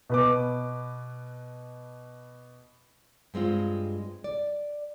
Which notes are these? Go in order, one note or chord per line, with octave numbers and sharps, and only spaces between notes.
B2 B4 D6
G2 G#3 C4 F4
D5